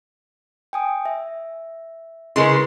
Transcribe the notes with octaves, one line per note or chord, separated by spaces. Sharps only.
G5 G#5 D#6
E5
C#3 G#3 C#4 E4 A#4 B4 C6